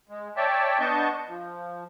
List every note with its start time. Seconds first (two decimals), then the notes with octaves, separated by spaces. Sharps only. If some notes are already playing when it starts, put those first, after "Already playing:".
0.09 G#3
0.37 C#5 D5 E5 G5 A5
0.80 B3 D4 D#5 A5 C#6 G6
1.28 F3